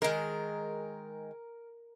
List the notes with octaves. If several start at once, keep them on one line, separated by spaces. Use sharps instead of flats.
D#3 G#3 A#4